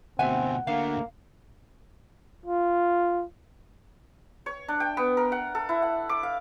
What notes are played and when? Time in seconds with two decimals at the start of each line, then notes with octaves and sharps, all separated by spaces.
0.19 D2 B2 C4 E5 F#5 G#5
0.67 D3 A3 A#3 F5
2.46 F4
4.46 C#5
4.68 D4
4.80 G5
4.97 B3
5.17 A#4
5.32 F#5
5.55 A4
5.69 E4
5.82 F#5
6.09 D6
6.23 F5